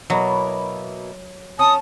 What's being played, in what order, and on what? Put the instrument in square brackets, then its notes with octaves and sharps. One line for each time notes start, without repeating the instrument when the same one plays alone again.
[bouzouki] B2 A#3 E4 [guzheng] F#3
[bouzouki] C#4 [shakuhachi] A5 [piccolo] D#6